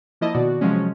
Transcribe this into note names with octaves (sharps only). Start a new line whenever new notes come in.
F3 A#3 E4 D#5 A5
B2 D#3 F#4 D5
C3 F3 F#3 G#3 C#4